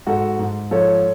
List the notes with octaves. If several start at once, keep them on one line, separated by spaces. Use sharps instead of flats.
G#2 F#4 A4
G#2
F3 A4 C#5